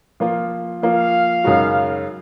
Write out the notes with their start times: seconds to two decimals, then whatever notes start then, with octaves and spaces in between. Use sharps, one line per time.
0.20 F3 A#3 F4
0.83 F3 A#3 F4 F5
1.44 F#2 C#3 G#3 D#4 F#4